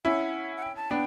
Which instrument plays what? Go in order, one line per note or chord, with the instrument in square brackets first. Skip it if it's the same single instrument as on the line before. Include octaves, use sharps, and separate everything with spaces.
[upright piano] C#4 E4 [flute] F#5
[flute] F#5
G5
A5
[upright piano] B3 D4 [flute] G5